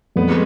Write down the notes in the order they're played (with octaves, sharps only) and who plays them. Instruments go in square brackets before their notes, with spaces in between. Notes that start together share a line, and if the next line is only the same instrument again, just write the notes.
[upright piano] F2 [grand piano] B3
[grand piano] G#3